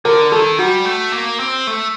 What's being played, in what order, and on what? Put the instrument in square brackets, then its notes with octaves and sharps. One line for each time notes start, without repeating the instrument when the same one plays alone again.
[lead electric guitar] D3 [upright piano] A#4
[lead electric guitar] D#3 [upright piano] A4
[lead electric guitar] G3 [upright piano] F#4
[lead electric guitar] A3
A#3
C4
A3